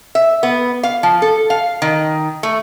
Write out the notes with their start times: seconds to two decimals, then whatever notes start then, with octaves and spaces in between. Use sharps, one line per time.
0.15 E5
0.43 B3
0.83 F5
1.03 F3
1.22 A4
1.50 F5
1.82 D#3
2.43 A3